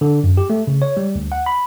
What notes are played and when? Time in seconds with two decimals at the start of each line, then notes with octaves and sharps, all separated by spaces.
0.01 D3
0.24 F#2
0.37 G4
0.50 A3
0.67 C#3
0.82 C#5
0.97 G3
1.15 D2
1.32 F#5
1.46 B5